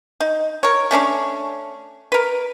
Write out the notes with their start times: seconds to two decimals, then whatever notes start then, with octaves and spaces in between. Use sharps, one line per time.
0.20 D#4
0.63 A#4 C#5
0.91 A3 C#4 D4 C#5
2.12 A#4 B4